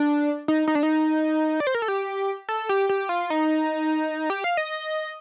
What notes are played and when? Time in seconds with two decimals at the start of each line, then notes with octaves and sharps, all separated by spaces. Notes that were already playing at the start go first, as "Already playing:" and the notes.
Already playing: D4
0.48 D#4
0.68 D#4
0.75 D4
0.83 D#4
1.60 D5
1.67 C5
1.75 A#4
1.82 A4
1.88 G4
2.49 A4
2.69 G4
2.89 G4
3.09 F4
3.30 D#4
4.30 G4
4.44 F5
4.57 D#5